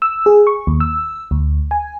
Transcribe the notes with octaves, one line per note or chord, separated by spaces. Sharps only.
E6
G#4
C#6
D#2
E6
D2
G#5